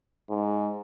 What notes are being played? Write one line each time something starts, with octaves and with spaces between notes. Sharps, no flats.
G#2